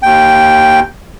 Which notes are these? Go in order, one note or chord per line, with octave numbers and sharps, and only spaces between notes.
D#2 G5